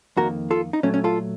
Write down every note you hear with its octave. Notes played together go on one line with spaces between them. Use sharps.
F2 D#3 A#3 F#4 A#4
F4 A4
D#4
A#2 F#3 A3 C#4
C#4
F4 A4